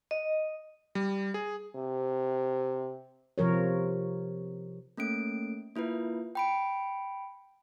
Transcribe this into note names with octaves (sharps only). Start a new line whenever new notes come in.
D#5
G3
G#4
C3
C3 F3 A#4 C#5
A3 A#3 C#4 D7
A#3 E4 F4 B4
G5 B5 D7